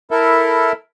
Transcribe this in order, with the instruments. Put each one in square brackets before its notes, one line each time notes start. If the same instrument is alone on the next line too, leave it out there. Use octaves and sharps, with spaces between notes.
[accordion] E4 A4 A#4 E5